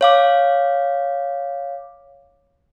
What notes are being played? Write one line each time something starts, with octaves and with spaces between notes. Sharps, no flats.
C#5 F5 D6